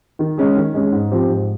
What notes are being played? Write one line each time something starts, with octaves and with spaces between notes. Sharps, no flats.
D#3
G#3 C#4 G#4
D#3
G#3 C#4 G#4
G#2
F3 C4 G4
G#2